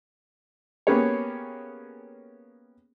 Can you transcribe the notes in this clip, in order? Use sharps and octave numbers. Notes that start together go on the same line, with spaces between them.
A#3 B3 C#4 G4 G#4 C#5